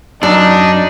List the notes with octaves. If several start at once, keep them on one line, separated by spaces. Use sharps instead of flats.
F#2 D4 D#4